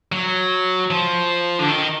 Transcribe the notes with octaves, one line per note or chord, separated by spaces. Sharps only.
F#3
F3
D3
D#3